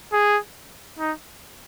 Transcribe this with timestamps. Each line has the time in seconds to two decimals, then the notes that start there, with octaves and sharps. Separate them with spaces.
0.13 G#4
0.99 D#4